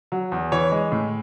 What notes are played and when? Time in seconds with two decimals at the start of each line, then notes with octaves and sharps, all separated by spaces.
0.12 F#3
0.32 E2
0.52 E3 C#5
0.72 G#3
0.92 A2